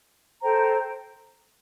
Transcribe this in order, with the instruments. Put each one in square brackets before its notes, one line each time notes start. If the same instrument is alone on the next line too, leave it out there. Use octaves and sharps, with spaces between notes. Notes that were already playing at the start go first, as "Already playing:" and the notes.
[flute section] A4 C5 G5 A#5